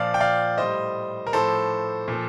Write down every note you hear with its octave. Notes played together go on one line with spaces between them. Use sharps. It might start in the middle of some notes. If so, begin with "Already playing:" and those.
Already playing: A#2 F3 D5 F5
G5
D5 F5
A2 G3 C5 D#5
A#4
A2 F3 A4 C5
A#2
F3